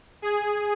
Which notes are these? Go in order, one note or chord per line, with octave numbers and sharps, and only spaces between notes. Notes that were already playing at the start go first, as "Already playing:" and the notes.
G#4